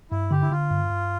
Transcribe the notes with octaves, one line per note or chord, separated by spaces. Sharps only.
G2 E4
D3 G4
E4
D3 F4
G2
G2